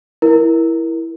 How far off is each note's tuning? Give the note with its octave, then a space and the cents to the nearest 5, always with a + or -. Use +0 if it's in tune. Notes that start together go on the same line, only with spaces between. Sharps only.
E4 +0 A#4 +15